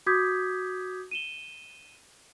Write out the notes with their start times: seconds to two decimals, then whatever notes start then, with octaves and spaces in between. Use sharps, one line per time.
0.06 F#4 D6 D#6 G6 G#6 B6
1.11 D#7 E7 G7